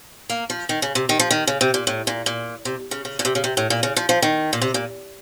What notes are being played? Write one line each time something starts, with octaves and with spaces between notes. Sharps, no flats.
A#3
F3
D#3
C#3
C3
D#3
F3
D#3
C#3
C3
A#2
A2
A#2
A#2
C3
C#3
C#3
A#2
C3
C#3
C3
A2
A#2
C#3
F3
F3
D#3
A#2
C3
A#2